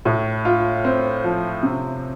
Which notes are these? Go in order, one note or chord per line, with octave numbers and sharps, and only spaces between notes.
A2
F4
C4
F3
C3